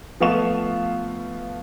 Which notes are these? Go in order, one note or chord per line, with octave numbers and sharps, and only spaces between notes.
F3 A3 B3 F5 C#6 E7